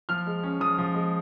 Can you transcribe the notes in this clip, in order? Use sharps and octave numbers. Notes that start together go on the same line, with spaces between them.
F3 F6
G#3
C#4
F3 D#6
F3
G#3